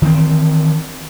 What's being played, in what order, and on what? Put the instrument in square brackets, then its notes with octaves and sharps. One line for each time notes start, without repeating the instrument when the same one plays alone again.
[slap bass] D#3 E3 A#3 C4